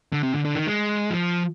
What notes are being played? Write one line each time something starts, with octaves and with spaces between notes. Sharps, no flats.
D3
C3
D3
D3
D#3
G#3
F3